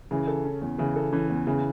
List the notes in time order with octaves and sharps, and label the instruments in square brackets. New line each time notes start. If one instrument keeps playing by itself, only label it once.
[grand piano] C#3 [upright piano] E3
[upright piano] A4
C#4
E2
[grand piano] C#3 [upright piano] E3
[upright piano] A4
[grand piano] E3 [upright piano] C#4
[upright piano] E2
[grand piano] C#3 [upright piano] E3